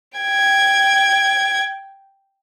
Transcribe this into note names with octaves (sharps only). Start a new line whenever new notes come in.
G5 G#6